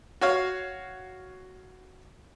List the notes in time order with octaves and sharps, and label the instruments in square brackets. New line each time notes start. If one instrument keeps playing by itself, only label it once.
[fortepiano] F#4 C#5 F5